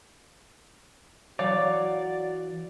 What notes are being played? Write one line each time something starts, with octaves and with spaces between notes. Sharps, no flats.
E3 F#3 F#4 C#5 D5 F5